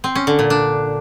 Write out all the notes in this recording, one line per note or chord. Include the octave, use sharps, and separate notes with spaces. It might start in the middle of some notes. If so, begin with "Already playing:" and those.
C4
C#4
D3
A#2
D4